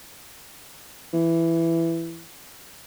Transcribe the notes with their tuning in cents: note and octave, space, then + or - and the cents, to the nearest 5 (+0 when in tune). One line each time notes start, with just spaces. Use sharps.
E3 +10